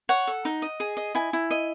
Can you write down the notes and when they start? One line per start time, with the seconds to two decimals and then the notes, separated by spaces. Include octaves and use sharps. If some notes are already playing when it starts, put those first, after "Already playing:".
0.09 C#5 F#5
0.27 A4
0.45 D#4
0.62 D#5
0.80 G#4
0.97 D#5
1.15 E4 G#5
1.33 E4
1.51 D#5